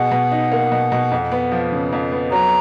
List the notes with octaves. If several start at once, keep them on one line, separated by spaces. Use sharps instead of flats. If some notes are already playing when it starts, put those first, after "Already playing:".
Already playing: B2 G#4 F#5
B2
D#4
A#3
B2
B2
F2
B3
F3
C#3
F2
B3
F#3 A#5